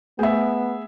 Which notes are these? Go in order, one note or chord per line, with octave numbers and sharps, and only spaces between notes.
A3 B3 G#4 E5